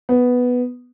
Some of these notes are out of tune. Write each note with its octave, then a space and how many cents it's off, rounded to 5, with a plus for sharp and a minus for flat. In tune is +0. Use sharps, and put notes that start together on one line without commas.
B3 +0